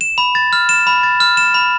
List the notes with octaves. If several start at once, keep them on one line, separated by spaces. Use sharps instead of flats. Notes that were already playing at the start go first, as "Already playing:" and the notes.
E7
B5
A6
F6
E7
B5
A6
F6
E7
B5